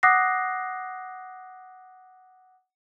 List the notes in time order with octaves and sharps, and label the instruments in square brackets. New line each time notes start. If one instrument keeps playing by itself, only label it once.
[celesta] F#5 D6 D#6 F#6 A#6 C7